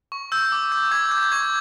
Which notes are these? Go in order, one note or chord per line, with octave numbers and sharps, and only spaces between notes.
C#6
E6 G6
D6
G6
D6 G#6
G#6
G6
G#6
C#6 G#6